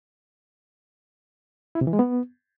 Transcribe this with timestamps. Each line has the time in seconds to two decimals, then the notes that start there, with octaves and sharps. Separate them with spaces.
1.75 E4
1.81 C3
1.87 E3
1.93 G#3
1.99 B3